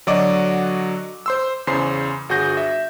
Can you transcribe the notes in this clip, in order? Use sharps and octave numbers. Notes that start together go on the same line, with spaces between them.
D3 F#3 F#4 D5 D#5 D6
C5 C6 E6
E2 C#3 C5 C6 C7
G1 F#4 G#4 G6 A#6
E5